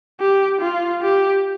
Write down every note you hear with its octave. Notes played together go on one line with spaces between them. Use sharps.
G4
F4
G4